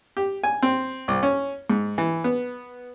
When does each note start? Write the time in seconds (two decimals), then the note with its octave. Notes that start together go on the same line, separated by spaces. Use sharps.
0.17 G4
0.44 G#5
0.63 C4
1.08 C2
1.23 C#4
1.70 G#2
1.98 E3
2.24 B3